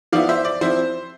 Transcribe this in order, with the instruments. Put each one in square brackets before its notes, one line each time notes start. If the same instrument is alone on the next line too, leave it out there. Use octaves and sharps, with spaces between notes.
[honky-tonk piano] F3 B3 E4 D5 F5
C5 E5
D5
F3 C4 E4 C5